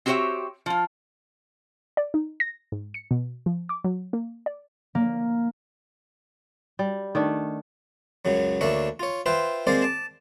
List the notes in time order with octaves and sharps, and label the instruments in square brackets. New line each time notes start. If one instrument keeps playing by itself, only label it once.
[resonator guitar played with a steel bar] C4 F#4 G4 C5 C#5 E5
F3 F4
[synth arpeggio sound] D5
D#4
A#6
G#2
C#7
B2
F3
D6
F#3
A#3
D5
[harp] A#3
[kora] G3
D#3 A3 D4
[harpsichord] C#2 F#2 C#3 F#3
D2 A#3 D4 C#5 E5
F4 C#5
F4 B4 C5 E5 G5
G#3 A#3 C4 C5 D5 F5
A5 D6